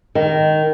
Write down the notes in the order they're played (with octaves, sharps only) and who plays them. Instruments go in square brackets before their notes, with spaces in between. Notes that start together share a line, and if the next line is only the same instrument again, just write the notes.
[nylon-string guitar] D#3